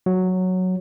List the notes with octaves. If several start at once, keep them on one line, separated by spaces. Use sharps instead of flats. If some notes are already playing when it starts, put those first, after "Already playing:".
F#3